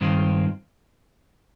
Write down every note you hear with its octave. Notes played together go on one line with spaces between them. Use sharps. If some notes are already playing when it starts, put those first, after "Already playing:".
G2 D#3 G#3 C4 F4